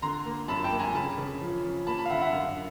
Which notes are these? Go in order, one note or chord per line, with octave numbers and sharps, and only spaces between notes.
D3 A#5 C6
A#3
F#2 A5 B5
G5 A5
A#3
G#5 A#5
C#3 A5 B5
C#3
F3
F3
A#3 A5 B5
A5 B5
F5
D3 E5 F#5
E5 F#5
F#2 F5